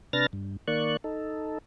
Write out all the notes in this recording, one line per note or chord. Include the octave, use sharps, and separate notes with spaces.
C3 D4 B4 F6 A6 A#6
G2
D#3 A#3 D5 C#6 F#6
D#4 A4